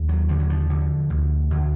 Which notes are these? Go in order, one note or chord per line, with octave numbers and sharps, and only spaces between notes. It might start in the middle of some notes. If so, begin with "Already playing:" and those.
Already playing: D#2
F#3
D3 F3
F#3
F3
D3
D2
D2